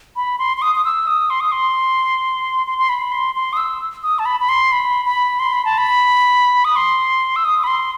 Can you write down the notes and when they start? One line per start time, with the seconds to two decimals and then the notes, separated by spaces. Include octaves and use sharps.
0.16 B5
0.39 C6
0.57 C6
0.62 D#6
0.75 D#6
0.85 E6
1.07 D#6
1.30 C6
1.40 D#6
1.52 C6
2.67 C6
2.79 C6
2.89 B5
3.12 C6
3.35 C6
3.53 D#6
3.57 E6
4.03 D#6
4.19 A5
4.25 B5
4.40 B5
4.49 C6
4.72 B5
5.05 B5
5.40 C6
5.53 B5
5.65 A5
5.78 B5
6.65 D#6
6.76 C6
7.36 E6
7.45 D#6
7.64 B5
7.67 C6